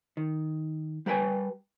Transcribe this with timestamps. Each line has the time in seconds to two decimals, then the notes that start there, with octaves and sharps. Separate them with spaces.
0.17 D#3
1.06 G3 A#4 B4 G5 G#5